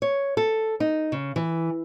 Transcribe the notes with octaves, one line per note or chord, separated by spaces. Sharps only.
C#5
A4
D#4
C#3
E3